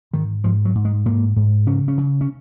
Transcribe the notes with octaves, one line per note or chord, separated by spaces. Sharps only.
G#2 D#3
G#2 F3
F#3
G#2
G#3
G#2 A#3
G#2
C#3 C#4
C#4
C#3
C#4